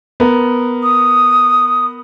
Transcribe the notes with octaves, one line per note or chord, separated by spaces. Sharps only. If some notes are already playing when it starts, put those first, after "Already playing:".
B3 A#4
D#6